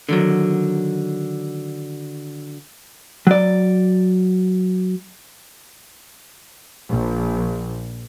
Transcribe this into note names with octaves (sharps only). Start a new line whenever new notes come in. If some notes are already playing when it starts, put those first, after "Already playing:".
D3 D#3 F#3
F#3 D5
A#1